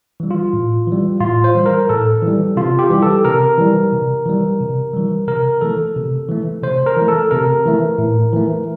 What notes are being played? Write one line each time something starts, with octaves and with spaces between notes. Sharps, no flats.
E3 G3
F4
A2
E3 G3
A2 F4
C5
E3 G3
A#4
A2 A4
E3
G3
C3 F4
G4
E3 G3
A4
C3 A#4
E3 G3
C3
E3 G3
C3
E3 G3
C3 A#4
E3 A3 A4
C3
E3 A3
C3 C5
A#4
E3 A3
A4
C3 A#4
E3 A3
A2
E3 A3